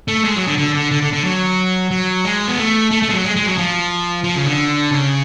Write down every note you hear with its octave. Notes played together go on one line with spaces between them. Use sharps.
A3
G#3
F#3
D3
D3
D3
D3
D3
D3
F#3
F#3
G#3
B3
A3
A3
A3
G#3
F#3
G#3
G#3
F#3
F3
F3
C#3
D3
C#3